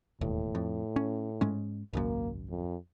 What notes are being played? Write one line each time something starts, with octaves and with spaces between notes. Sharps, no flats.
E1 D#2 A2
F2
C#4
G#2 G#3 C#4
G#1 C#2 F#2 A#3
F2